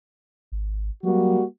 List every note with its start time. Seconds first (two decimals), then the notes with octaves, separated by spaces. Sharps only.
0.52 G#1
1.03 F#3 G3 A#3 F#4